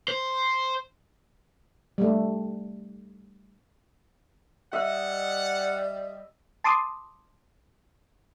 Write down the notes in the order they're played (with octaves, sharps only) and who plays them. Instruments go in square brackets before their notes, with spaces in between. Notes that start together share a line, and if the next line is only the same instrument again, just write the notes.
[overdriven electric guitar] C5
[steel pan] G3 A3
[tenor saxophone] G3 [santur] D#5 E5 [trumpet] F#5
[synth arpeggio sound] A5 C6 D6 D#6